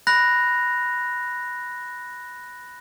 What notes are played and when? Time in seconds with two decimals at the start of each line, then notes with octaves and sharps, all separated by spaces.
0.07 B5 F#6 A#6 F7